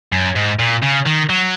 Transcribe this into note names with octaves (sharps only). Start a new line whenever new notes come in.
F#2
G#2
A#2
C#3
D#3
F#3